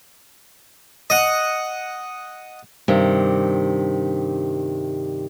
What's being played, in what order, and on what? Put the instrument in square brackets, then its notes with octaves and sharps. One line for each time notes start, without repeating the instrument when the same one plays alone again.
[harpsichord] D#5 F#5
[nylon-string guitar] G2 C3 D#3